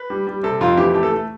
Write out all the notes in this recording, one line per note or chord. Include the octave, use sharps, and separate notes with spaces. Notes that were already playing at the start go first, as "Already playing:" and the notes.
Already playing: B4
G3
G3
C3 A4
F2 F4
E3 G4
A3 G4
A4
A3